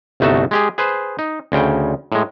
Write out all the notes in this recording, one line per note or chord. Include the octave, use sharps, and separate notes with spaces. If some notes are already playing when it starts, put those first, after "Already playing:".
G1 C2 A3 D#4 F#4 A5
G#3 G4 G#4
G#4 B4 C5
D#4
D2 C#3 G5
A2 G#3